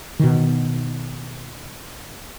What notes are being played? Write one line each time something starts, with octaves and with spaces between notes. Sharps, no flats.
B2 D#3